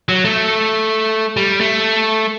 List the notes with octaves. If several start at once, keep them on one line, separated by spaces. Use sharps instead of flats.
F#3
A3
G3
A3